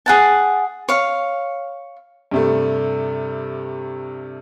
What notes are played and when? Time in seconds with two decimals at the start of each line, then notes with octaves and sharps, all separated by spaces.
0.06 G#4 F#5 A5
0.89 C#5 F5
2.31 G2 C3 A3